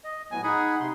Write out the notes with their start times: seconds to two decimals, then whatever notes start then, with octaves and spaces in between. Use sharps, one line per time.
0.04 D#5
0.31 A2 F#3 B3 G#5
0.43 D#4 G#4 F#5 B5
0.80 C3 C6